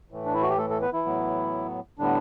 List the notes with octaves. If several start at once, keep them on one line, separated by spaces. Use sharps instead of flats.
A2 E3 A3
D4
E4
F#4
G4
A3 A4
A3 A4
B3 B4
E3 E4
A2 F#3 B3
A2 D3 G3 B3 D4